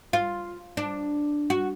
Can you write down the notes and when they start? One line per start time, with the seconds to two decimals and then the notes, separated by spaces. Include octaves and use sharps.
0.13 F4
0.77 D4
1.50 F#4